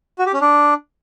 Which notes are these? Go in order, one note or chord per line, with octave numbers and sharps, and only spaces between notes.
F#4
G4
C#4
D4